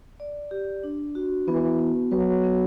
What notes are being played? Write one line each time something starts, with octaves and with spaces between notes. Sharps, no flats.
D5
G4
D4
F#4
E3 B3
B3
F#3 B4
B3